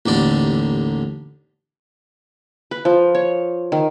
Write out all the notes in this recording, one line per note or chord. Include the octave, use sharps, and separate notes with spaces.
A1 D#2 D3 D5
B4
F3
C#5
D#3